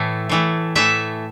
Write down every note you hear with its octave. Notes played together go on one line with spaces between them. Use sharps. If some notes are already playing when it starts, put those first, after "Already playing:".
Already playing: A2 E3 A3
A2 E3 A3
A2 E3 A3 E5